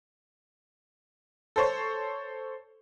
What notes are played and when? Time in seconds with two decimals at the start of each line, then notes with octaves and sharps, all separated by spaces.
1.56 A4 C5 C#5